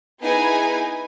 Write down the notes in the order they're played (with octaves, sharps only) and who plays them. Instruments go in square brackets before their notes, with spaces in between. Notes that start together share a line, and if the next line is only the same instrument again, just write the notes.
[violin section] B3 D#4 E4 G#4 B4 G#5